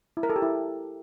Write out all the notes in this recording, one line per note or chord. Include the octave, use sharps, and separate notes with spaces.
E4
A#4
A4
G4
E4